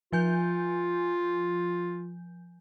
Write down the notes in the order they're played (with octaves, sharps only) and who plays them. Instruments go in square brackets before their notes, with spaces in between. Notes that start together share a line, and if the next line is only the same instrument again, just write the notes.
[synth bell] F3 G#5 G6 [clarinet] F4